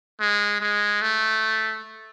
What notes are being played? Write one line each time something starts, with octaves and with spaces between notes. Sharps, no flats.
G#3
G#3
A3